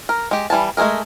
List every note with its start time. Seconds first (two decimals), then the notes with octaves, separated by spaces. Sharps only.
0.09 A#4
0.31 G#3 G4
0.50 E3 G3 G#5 A5
0.77 G#3 A3 D4 G#4 A#4